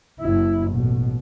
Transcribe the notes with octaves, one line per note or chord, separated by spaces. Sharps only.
F#1 E4
A1 B2